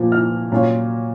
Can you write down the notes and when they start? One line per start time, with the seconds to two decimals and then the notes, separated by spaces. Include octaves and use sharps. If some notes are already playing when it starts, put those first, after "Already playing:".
Already playing: A#2 F3 A#3 F4
0.12 F6
0.52 A#2 F#3 C#4 F4